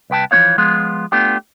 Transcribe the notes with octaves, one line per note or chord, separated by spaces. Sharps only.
C2 B4 G5 A5
E3 F3 C#4 D#4 C#5 F5
F3 G#3 B3 F4
A3 B3 D4 F4 G4